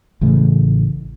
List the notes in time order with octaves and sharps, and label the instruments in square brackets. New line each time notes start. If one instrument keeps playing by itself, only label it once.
[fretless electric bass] A1 C#3 E3 A3